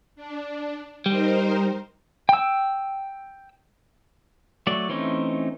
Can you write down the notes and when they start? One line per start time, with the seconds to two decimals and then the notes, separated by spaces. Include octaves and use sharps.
0.16 D4
1.06 G3 D#4 A#4 C5
2.29 G5 E6
4.67 F#3 A3 D5
4.89 E3 A3 C4 C#4 D#4